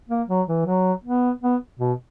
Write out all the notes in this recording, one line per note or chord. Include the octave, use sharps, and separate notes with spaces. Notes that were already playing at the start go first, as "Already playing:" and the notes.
A#3
F#3
E3
F#3
B3
B3
B2